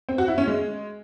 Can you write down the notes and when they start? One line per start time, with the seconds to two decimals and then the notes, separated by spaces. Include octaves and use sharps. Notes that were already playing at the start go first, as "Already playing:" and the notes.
0.09 C4
0.18 F#4
0.28 E4
0.38 C#4
0.47 G#3